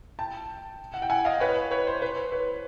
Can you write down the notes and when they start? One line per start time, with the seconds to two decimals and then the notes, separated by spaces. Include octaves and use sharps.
0.19 G5 A5
0.94 F#5
1.02 G5
1.10 F#5 G#5
1.25 D#5 F5
1.40 B4 C#5
1.71 B4 C#5
1.87 C5
2.02 B4
2.16 C5
2.32 B4 C#5